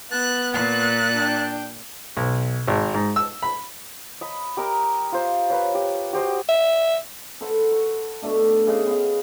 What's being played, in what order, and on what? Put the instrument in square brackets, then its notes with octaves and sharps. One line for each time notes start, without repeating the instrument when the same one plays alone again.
[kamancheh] B3 [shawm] A5 [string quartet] F#6
[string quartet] A#2 F#6 [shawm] A5
[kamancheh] D4 G5
[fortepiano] B1
G#1
G#2
E6
B5
[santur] D#5 B5
G4 A#4 D#5
F4 C5
B4 C#5
G4
F#4 G4 C5 D#5
[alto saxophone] E5
[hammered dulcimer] A4 B4 C5 F#5
C#6
B2 A3 D4
C#3 G#4 C5 D#5
B3 F5